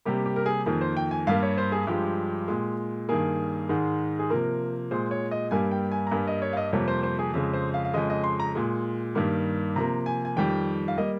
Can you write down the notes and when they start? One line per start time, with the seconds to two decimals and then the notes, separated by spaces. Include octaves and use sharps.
0.06 C3 G3 A#3 G4
0.26 G4
0.36 A#4
0.46 G#4
0.66 F2 D#3 A#3 G#4
0.81 C5
0.97 G5
1.11 G#5
1.27 G2 G3 A#3 F5
1.43 C#5
1.58 C5
1.72 G#4
1.87 G2 F3 G#3 G4
2.48 A#2 G#3
3.09 G2 D#3 A#3 G#4
3.69 G#2 D#3 G#3
4.19 G#4
4.30 C3 F3 A#3 A#4
4.91 A#2 G#3 C5
5.11 C#5
5.31 D#5
5.51 G2 G3 A#3 G#5
5.71 G5
5.92 G#5
6.07 A#5
6.11 G2 G3 A#3 G#5
6.27 D#5
6.42 C#5
6.53 F5
6.57 D#5
6.73 F2 C3 G3 A#3 C#5
6.88 C5
7.03 C5
7.19 G#4
7.34 F2 C#3 G#3
7.54 C5
7.74 F5
7.85 F5
7.94 F2 C#3 G#3 D#5
8.10 D#5
8.24 C6
8.40 A#5
8.55 A#2 G#3
9.15 G2 D#3 G3 A#3
9.76 C3 F3 A#3 A#5
10.06 G#5
10.25 G#5
10.36 F2 D#3 G3 G5
10.88 F5
10.97 G3 A#3 D#5